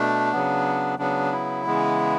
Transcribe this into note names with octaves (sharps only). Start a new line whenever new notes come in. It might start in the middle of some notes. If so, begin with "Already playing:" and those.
Already playing: B2 A3 D4
C#3 F#3 B3
C#3 F#3 B3 D4
E4
C#3 E3 G#3 B3